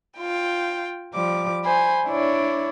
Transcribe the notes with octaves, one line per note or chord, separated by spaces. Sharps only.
F4 G5
F3 G3 D6
C5 G#5 B5
D4 E4 C#5 D5